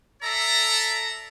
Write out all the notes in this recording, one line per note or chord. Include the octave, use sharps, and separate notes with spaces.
A4 D5 E5 A#5